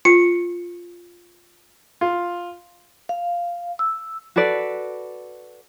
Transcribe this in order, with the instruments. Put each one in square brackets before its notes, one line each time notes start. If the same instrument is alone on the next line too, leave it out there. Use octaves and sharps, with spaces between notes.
[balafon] F4 [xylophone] C#7
[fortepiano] F4
[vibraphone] F5
E6
[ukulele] F#4 A4 B4 D5